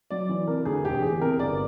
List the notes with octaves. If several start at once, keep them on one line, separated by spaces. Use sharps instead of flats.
F#3 D5
E3
C3 A#4
D2 G#4
E1 G4
E3 G#4
C3 A#4
G1 D5